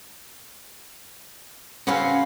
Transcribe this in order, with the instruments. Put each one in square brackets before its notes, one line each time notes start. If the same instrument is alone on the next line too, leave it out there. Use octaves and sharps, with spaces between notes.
[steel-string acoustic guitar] C#3 C4 C#4 [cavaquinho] F#4 B4 F5